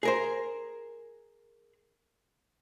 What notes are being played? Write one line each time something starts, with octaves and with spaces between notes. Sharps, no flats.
G#4 A#4 C5